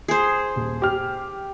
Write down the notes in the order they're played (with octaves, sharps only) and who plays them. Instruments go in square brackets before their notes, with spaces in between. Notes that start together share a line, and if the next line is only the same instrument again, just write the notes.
[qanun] G#4 C5
[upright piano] D#1
G4 F6